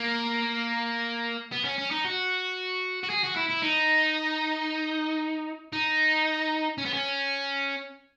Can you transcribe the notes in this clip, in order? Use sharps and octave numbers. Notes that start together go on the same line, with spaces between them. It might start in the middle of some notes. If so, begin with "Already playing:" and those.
Already playing: A#3
B3
C#4
C#4
D#4
F#4
F#4
G#4
F#4
E4
E4
D#4
D#4
C#4
B3
C#4